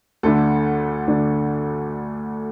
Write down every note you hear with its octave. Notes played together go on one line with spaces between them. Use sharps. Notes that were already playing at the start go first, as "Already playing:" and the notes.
D2 D3 A3 D4 A4
D2 D3 A3 D4